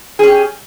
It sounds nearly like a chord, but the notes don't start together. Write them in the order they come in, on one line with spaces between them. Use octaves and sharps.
G#4 C#4 G4